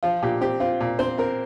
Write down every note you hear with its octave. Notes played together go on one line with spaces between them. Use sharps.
F3 F4
A#2 G4
C4 G4
C4 F4
A#2
C4 C5
C4 A#4